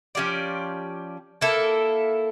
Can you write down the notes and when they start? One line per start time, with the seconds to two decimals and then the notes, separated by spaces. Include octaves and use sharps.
0.15 F3 C#4 G4 D5
1.41 A#3 E4 A4